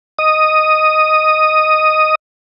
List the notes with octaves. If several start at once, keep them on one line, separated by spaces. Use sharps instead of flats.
D#5 D#6